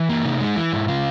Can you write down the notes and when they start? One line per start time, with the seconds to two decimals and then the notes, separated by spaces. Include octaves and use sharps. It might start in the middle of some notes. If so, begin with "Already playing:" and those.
Already playing: E3
0.09 A#3
0.25 C3 D#4
0.41 G#3
0.56 E3 E4
0.72 G#2
0.88 C#3 F4